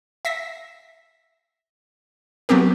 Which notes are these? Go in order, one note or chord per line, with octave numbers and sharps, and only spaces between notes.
E5 A#6 B6
F#3 A3 B3 C4 G4 A#4